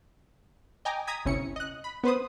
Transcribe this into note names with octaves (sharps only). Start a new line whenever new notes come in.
D#5 G5 G#5 A#5 D6
A#5 D#6 G#6 B6
G1 D2 C3 C#4 E4 C#7
D#5 F#6
B5
B3 B4 C5 D#6